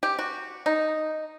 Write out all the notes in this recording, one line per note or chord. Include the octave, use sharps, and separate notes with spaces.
G4
F#4
D#4